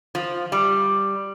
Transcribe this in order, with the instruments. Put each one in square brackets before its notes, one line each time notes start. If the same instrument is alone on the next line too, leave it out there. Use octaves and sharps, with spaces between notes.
[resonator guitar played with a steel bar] F3
G3